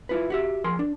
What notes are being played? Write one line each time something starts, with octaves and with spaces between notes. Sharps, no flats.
E4 F4 B4
F#4 G4 E5
F3 G#4 A#4 C6
D4